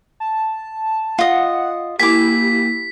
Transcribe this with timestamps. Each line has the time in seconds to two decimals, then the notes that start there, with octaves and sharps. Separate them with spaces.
0.20 A5
1.19 F4 D#5 F#5
2.00 A#3 E4 G4 G#5 D6 B6